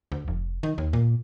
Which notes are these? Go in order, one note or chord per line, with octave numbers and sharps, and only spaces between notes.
D2
F1
D#3
D#2
A#2